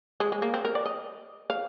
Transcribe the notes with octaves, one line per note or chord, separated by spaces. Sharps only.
G#3
G#3
A#3
C4
A#4
D5
D#5
F5